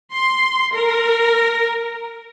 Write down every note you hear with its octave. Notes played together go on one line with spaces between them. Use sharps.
C6
A#4